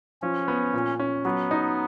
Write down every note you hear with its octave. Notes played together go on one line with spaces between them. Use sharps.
F3 C#4
B3
A#2
C#4
F#3 B3
D#4